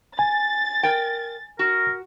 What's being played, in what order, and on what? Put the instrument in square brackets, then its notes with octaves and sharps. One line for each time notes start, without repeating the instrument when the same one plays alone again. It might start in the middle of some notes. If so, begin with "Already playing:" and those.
[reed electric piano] G#5 [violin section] A6
[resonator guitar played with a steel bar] A#4 G5
[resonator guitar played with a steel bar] F#4 [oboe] A#4